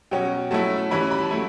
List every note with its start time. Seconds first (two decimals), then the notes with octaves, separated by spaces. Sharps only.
0.11 B2 F#3 C#4 G5
0.51 F#3 A3 C#4 E4 A5
0.91 E3 G3 C#4 E4 B5
1.11 B5
1.21 A5
1.31 F#3 A3 E4